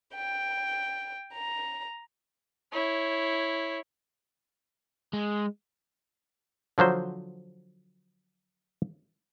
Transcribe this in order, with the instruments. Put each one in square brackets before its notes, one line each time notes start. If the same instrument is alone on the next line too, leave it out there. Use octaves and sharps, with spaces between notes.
[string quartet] G5
A#5
[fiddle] E4 C#5
[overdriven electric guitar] G#3
[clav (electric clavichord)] D3 F3 F#3 C5